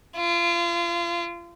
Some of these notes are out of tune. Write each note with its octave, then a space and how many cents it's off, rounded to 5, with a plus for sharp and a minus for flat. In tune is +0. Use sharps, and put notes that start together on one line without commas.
F4 -35